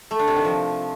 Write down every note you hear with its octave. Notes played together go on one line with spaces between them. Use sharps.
A3
D4
C3
D#3
F3